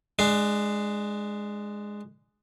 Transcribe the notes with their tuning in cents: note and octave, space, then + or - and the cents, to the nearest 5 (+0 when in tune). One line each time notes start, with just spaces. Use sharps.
G#3 +0 D4 +20